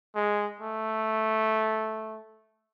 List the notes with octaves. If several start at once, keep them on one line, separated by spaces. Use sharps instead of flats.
G#3
A3